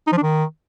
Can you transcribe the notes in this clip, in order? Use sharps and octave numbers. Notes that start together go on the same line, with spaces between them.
D#4
F3
D4
D#3